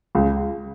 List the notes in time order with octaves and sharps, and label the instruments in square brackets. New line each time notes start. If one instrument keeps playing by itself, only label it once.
[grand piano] C#2